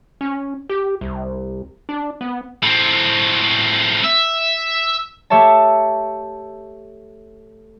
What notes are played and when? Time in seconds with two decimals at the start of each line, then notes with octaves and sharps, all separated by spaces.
0.21 C#4
0.69 G4
1.01 C2
1.89 D4
2.21 B3
2.63 A2 C4
4.04 E5
5.30 A3 G4 C#5 E5 A5